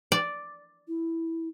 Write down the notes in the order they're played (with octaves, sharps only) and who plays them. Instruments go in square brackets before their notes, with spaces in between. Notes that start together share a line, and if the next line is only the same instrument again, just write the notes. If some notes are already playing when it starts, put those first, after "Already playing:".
[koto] D5
[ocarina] E4